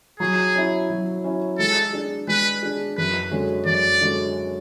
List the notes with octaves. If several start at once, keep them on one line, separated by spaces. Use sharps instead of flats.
F#3 G#4
C#4 E4
F#3
C#4 E4
G#3 A4
D4 G#4
G#3 B4
D4 G#4
F#2 B4
D3 G#3 C#4 F#4
F#2 D5
D3 G#3 C#4 F#4